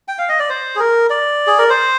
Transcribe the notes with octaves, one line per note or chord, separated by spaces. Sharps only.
G5
F5
D#5
D5
C5
G#4
A#4
D5
G#4
A#4
C5